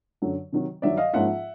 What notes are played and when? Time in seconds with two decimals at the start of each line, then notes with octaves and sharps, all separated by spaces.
0.22 F#2 D3 F#3
0.52 C3 D#3 F#3
0.82 G2 D#3 F#3 D5 E5
0.97 D#5 F5
1.13 G#2 F3 A#3 C#4 F4 E5 F#5